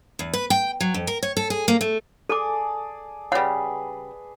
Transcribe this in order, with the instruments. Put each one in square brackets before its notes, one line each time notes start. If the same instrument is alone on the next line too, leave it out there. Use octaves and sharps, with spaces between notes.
[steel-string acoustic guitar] E2
B4
G5
F#3
F2
A#4
C#5
A4
G#4
A#3
A3
[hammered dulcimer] G#4 D5 A5 [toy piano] A4 D6
[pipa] C#3 G3 [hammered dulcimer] G#4 B4 [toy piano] F#5